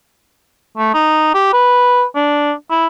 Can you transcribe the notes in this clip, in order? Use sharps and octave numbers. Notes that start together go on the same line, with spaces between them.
A3
D#4
G4
B4
D4
E4